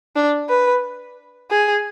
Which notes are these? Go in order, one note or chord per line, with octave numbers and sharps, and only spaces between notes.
D4
B4
G#4